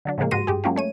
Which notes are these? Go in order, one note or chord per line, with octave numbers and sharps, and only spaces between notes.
D3 F#3 D4
A2 C#3 F3 G#3 A#3
G#2 F#4 G4 C6 A#6 D#7
G2 G4 G#4
F#3 G#3 A#3 C#4 F4 G4
A3 C#5 D#7